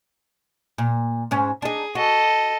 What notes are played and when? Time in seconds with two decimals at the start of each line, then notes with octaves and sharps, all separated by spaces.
0.78 A#2
1.31 G#2 C#4
1.62 D4 D#4 G#4
1.95 F#4 A4 D#5